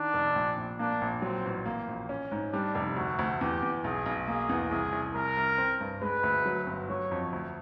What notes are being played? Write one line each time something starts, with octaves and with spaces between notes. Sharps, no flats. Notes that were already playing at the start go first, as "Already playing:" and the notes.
Already playing: D#3 D4
F1
A#1
A#1
A#3 D4
A#1
F#3 C4
A1
A#3
A#1
C#4
G#2
G3 D4
F1
D2 F#4
D2
E2 G4
E2
B1 G#4
B1
A#3 G#4
E2
C2 G#4
C2
C2 A#4
C2
C4
G2
G#3 B4
D2
F#3
G1
F#3 C#5
F2
D2